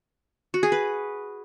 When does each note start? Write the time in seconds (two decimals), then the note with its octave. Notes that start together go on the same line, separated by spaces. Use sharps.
0.54 F#4
0.63 G#4
0.72 B4